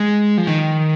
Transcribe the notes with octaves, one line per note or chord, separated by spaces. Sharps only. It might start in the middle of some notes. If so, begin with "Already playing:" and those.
Already playing: G#3
F3
D#3